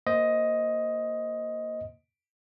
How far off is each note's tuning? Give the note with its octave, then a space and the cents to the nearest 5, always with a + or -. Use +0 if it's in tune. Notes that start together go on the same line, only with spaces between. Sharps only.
A#3 +0 C5 +0 D#5 +10